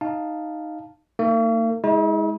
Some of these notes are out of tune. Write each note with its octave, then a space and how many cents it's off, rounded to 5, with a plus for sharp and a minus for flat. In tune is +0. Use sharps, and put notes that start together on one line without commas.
D#4 +0 F5 +0 A5 +0
A#3 -45 D#4 +0
G#3 +0 E4 -45